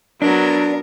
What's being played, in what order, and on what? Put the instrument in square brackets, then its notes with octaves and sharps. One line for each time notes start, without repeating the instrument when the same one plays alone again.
[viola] F#3 [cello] B3 A#4 [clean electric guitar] D4